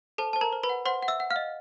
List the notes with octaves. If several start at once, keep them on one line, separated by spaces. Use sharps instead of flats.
A4 C5 A5
C5 A5
A#4 A#5
C5
B4 B5
F#5
C5 F#5 C6
F#5
E5 E6
F#5
F5 F6
D#5